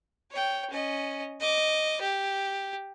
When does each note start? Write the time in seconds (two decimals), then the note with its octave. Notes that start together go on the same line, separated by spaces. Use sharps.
0.31 C#5 G5
0.70 C#4 D#5
1.40 D#5 D6
2.01 G4